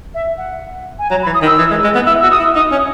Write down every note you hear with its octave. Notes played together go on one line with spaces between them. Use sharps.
E5
F#5
G#5
F#3 A#5
B5
E3
D#6
D#3
E6
E3
G#3
G#3
B3
E4 E6
F#4 E6
D#6
E4
D#4 D#6
C#4